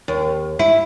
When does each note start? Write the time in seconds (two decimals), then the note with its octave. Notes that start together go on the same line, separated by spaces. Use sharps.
0.08 D#2
0.59 E4